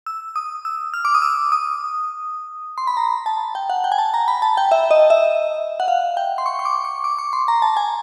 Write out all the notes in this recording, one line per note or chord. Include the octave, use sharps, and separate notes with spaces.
E6
D#6
E6
F6
D6
D#6
E6
D#6
C6
B5
A#5
A5
G5
F#5
G5
G#5
A5
A#5
B5
A5
G5
E5
D#5
E5
F#5
F5
G5
C6
C#6
C#6
D6
C#6
D6
C#6
C6
A#5
A5
G#5